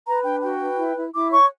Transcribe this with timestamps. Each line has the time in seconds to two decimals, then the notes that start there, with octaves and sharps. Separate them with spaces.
0.06 B4 A#5
0.24 D4 G5
0.42 F#4 G5
0.60 B4
0.78 E4
0.96 E4
1.14 E4 D6
1.32 C#5 C#6